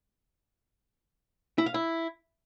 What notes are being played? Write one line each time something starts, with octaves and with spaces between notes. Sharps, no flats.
E4
F5
E4